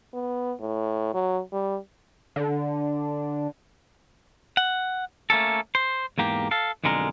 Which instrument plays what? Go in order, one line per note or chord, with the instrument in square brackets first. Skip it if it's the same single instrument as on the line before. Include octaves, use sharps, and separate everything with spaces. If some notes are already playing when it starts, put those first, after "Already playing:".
[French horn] B3
A2
F#3
G3
[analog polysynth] D3
[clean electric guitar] F#5
A3 A#3 C#4 A4
C5
E2 G#2 A#3 G4
A4 F5
B1 F2 D3 G#3 A#4